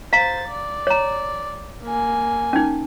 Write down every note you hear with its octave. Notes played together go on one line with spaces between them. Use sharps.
C5 F5 A#5 A6
D5
C#5 A#5
A#3 G#5
C#4 D#4